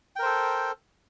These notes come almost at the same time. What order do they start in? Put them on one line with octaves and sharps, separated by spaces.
G5 A#4 C5 A4